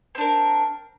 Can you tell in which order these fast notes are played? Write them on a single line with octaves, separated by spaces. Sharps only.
C4 D4 A#4